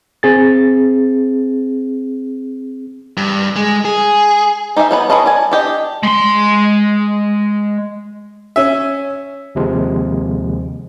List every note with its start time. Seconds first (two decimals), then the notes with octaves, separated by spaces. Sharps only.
0.23 C4 G#4 A6
3.17 G2
3.56 G#3
3.85 G#4
4.76 D#4 G4 G#4 D5 E5
4.91 F#3 B3 B4
5.10 F#3 G#4 B4 D#5 A5
5.26 D5 G#5
5.51 D4 G4 D#5
6.03 G#3 C6
8.56 C#4 E5
9.55 D#2 C3 F3 G#3